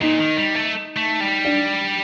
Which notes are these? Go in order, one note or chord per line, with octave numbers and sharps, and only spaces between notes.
A#2 D#4
D#3
G3
A3
A3
G3
D4